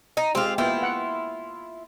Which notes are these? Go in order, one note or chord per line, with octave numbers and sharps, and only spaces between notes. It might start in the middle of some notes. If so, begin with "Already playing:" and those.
D#4
G#3 C4 F4 G4
A#3 B3 E4 F4 G5
F#5